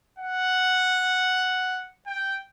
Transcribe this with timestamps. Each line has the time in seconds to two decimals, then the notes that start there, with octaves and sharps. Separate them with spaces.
0.19 F#5
2.06 G5